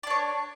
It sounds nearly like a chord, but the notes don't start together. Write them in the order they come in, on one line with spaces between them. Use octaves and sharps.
D5 D4 C#5